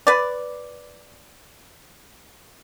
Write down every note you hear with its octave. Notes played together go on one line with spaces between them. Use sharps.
B4 D5